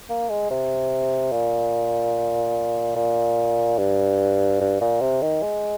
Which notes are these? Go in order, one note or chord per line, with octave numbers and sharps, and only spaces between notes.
A#3
G#3
C3
A#2
A#2
G2
G2
A#2
C3
D#3
G#3